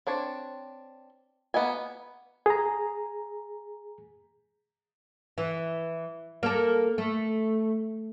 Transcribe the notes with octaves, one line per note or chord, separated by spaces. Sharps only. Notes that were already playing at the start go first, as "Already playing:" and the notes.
C4 D4 C#5
A#3 B3 E4 D#5 G#5
G#4 A#5
E3
A#3 A4
A3